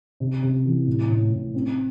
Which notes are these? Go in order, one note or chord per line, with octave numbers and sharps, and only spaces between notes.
C3
C3
E3
A2
A2
A2
C4